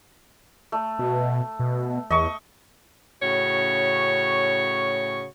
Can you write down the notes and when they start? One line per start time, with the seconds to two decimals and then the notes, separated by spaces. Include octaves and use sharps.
0.72 A3
0.99 B2
1.60 B2
2.11 E2 D#5 C#6
3.22 A2 C#3 C#4 F#4 C#5